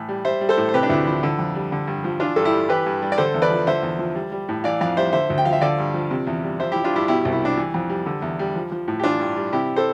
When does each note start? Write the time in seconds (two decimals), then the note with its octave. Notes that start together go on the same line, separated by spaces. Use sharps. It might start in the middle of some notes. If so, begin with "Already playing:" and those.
Already playing: A2 E3
0.09 G3
0.25 G3 C5 E5
0.41 G3
0.49 A4 C5
0.57 A2
0.69 C5
0.74 C3 G4 B4
0.83 D4
0.90 D2 E4
1.06 F3 E4
1.23 D3
1.39 F2
1.55 G3
1.72 D3
1.87 G2
2.04 F3
2.20 E3 D4 F4
2.36 G2 A4
2.45 E4 G4
2.53 G3
2.69 E3 G4 B4
2.86 G2
3.02 G3
3.12 D5
3.18 D3 A4 C5
3.34 E2
3.42 B4 D5
3.50 F3
3.67 D3 C5 E5
3.83 E2
3.99 F3
4.15 G3
4.32 G3
4.49 A2
4.64 E3 D5 F5
4.81 F2 D5 F5
4.97 G3 C5 E5
5.13 D3 C5 E5
5.30 D2
5.38 G5
5.45 F3 F5
5.53 E5
5.61 D3 D5 F5
5.78 G2
5.94 F3
6.11 C3
6.27 E2
6.43 G3
6.59 F3 C5 E5
6.72 E4 G4
6.76 F3
6.84 D4 F4
6.93 G2 E4 G4
7.08 B2 E4 G4
7.25 C2
7.32 E4
7.42 G3 D4
7.57 E3
7.74 F2
7.89 G3
8.06 D3
8.22 E2
8.39 G3
8.55 F3
8.72 F3
8.88 A2
8.99 G4
9.04 E3 D4 F4
9.19 G2
9.36 G3
9.53 C3 E4 G4
9.76 A4 C5